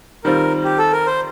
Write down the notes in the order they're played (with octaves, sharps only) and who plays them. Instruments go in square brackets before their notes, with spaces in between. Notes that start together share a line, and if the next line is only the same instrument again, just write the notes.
[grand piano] D#3 G3 C4 F4 [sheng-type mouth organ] A#4
[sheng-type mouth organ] G4
A4
A#4
C5